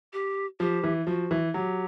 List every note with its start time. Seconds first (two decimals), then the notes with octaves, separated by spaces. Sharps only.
0.13 G4
0.60 F3 G4
0.84 E3
1.07 F3 F#4
1.31 E3
1.54 F#3 G4